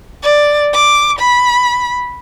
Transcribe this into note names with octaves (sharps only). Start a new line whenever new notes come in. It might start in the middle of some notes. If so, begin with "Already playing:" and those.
D5
D6
B5